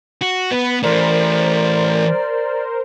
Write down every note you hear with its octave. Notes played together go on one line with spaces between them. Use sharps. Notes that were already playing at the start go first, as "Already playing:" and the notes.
F#4
B3 B4
E3 A3 A#4 C5 D5